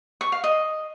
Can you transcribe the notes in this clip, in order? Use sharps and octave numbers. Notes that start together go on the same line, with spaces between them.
C#6
F5
D#5